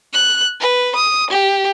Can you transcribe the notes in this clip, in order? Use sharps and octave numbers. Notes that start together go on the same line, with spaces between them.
F#6
B4
D#6
G4